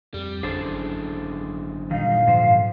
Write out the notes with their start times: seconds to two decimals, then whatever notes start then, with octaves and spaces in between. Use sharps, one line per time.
0.14 F2 G3
0.43 G#1 F#2 D3 G#4 A4 C5
1.91 A#2 D#3 G3 D#4 F5
2.27 G#2 F3 C5